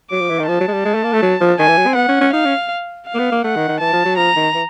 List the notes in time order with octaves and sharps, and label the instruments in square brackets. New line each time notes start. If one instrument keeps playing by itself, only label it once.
[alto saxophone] F#3 [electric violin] D6
[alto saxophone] F3
E3
D#3
[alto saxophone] F3 [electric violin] A5
[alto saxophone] F#3
G#3
G3
G#3
A3
A#3
A3
F#3
F3
[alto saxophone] D#3 [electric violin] G#5
[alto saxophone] E3
F#3
C4
[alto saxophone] B3 [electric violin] F#5
[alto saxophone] C#4
C#4
[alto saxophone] D#4 [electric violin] F5
[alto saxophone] C#4
[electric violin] F5
[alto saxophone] A#3
B3
A#3
[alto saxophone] A3 [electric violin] F#5
[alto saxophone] D#3
D#3
[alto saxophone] E3 [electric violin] A5
[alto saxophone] F3
F#3
[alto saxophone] F3 [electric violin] A#5
[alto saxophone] D#3
E3